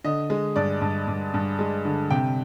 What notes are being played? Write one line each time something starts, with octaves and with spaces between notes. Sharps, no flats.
D3 D#5
G#3
G2 D5
G2
G2
G2
G#3
D3
C3 G5